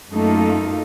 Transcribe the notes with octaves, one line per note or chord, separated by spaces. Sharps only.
F#2 A3 A#3 D#4 F4 A4